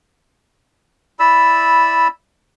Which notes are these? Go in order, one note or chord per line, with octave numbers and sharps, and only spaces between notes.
E4 D5 B5 E6